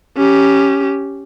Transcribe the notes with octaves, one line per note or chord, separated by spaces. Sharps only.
C#4 G4